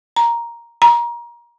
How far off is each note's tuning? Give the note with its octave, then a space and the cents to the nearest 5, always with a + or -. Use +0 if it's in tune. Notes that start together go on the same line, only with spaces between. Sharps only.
A#5 +5
A#5 +25